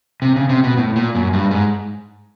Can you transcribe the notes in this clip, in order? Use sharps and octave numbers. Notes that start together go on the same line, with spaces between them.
C3
C#3
C3
B2
A2
A#2
F#2
G2
G#2